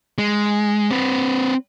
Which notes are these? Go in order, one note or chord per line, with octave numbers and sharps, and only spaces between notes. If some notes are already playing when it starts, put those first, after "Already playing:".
G#3
C4 B4